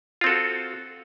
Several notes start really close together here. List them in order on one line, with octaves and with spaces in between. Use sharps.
F4 C4 A4 F#4